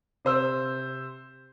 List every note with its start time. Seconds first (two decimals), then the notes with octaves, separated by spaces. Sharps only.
0.25 C3 C5 E6